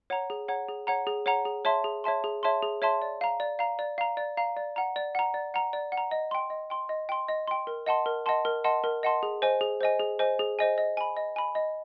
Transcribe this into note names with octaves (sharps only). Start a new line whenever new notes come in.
C#5 F#5 A#5
G#4
C#5 F#5 A#5
G#4
C#5 F#5 A#5
G#4
C#5 F#5 A#5
G#4
C#5 E5 A5 C6
G#4
C#5 E5 A5 C6
G#4
C#5 E5 A5 C6
G#4
C#5 E5 A5 C6
D5
F5 A#5
D5
F5 A#5
D5
F5 A#5
D5
F5 A#5
D5
F#5 A#5
D5
F#5 A#5
D5
F#5 A#5
D5
F#5
A#5
D#5
G5 C6
D#5
G5 C6
D#5
G5 C6
D#5
G5 C6
A#4
D#5 F#5 A5 C6
A#4
D#5 F#5 A5 C6
A#4
D#5 F#5 A5 C6
A#4
D#5 F#5 A5 C6
G#4
C5 D#5 G#5
G#4
C5 D#5 G#5
G#4
C5 D#5 G#5
G#4
C5 D#5 G#5
D#5
G#5 B5
D#5
G#5 B5
D#5